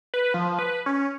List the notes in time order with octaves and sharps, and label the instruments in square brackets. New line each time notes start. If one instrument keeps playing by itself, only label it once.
[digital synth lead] B4
F3
B4
C#4